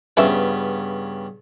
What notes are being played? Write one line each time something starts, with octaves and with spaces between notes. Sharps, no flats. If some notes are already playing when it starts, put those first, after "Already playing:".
G2 C#3 F3 B3 C#4 E5